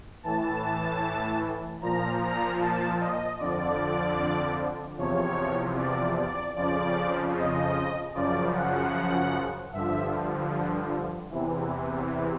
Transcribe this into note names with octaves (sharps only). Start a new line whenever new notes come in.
A2 E3 A5
A#2 F3 A#5
A#5
A5
D#5
F2 D3 F3 D5
E2 C3 F3 C#5
D5
D5
F2 C#3 F3 D5
D#5
F#2 C#3 F3 D5
F#5
G2 D3 F3 E5
E2 C3 E3